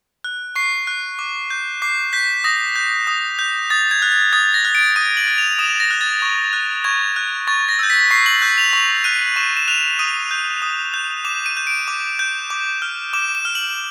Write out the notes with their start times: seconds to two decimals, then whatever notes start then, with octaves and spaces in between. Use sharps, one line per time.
0.24 F#6
0.56 C#6 C7
0.87 F#6
1.19 D6
1.50 G6
1.82 D6 C7
2.13 G6 B6
2.44 D#6 A#6
2.76 G6
3.07 D#6
3.39 G6
3.70 D#6 A6
3.91 G#6
4.02 F#6
4.12 G#6
4.33 D#6 A6
4.54 A#6
4.65 F#6
4.75 D7
4.96 D#6 D#7
5.17 F#7
5.27 F#6
5.38 F7
5.59 D#6 E7
5.80 A#6
5.91 F#6
6.01 A6
6.22 C#6
6.53 F#6
6.84 C#6 G#6
7.16 F#6
7.47 C#6 A6
7.69 A#6
7.79 E6 G6
7.90 B6
8.11 C#6 C7
8.26 F#7
8.42 E6 G6
8.58 F7
8.73 C#6 F7
9.04 F#6 D#7
9.36 C#6 E7
9.57 E7
9.68 F#6 F7
9.99 D#6 D#7
10.31 G6
10.62 D#6
10.94 G6
11.25 D6 E7
11.46 D#7
11.57 G6
11.67 D7
11.88 D6
12.19 G6
12.50 D6
12.82 F6
13.13 D6 E7
13.35 E7
13.45 F6
13.55 F#7